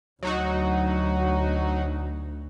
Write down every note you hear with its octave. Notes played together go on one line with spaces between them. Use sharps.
D2 F#3 D#4 F#4